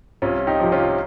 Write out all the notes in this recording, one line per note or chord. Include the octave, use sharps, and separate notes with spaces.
C2 C#4 F4
D#4 G4
C3 F3
C#4 F4
F4